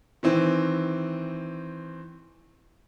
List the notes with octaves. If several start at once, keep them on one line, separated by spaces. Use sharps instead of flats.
D#3 E3 C4